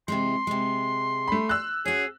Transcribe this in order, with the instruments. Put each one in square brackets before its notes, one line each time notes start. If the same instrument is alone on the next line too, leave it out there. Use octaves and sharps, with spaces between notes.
[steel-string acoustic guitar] C3 E3 G#3 [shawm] C6
[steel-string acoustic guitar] C3 G#3
[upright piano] A3 B5
E6 F#6
[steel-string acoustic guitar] C#4 F#4 [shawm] G#4